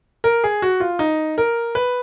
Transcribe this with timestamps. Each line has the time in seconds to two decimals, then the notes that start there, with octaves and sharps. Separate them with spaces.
0.24 A#4
0.44 G#4
0.62 F#4
0.80 F4
0.99 D#4
1.38 A#4
1.75 B4